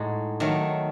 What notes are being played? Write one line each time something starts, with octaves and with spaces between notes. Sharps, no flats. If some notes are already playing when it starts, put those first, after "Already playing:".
Already playing: A2 G#3 D#4 F#4
D#3 F#3 A3